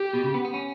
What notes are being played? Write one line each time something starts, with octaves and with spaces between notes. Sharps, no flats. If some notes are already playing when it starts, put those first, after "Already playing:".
Already playing: G4
B2
C#3
B3
B3
C#4